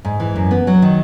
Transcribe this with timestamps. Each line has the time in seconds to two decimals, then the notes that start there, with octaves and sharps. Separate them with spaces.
0.05 G#2
0.20 E3
0.36 F#2
0.51 B3
0.67 F#3
0.82 D#3